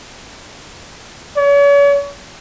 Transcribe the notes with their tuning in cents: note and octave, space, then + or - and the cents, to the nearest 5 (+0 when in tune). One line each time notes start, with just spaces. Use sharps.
C#5 +40